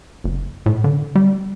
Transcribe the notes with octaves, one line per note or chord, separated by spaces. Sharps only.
F#1
A2
D3
G3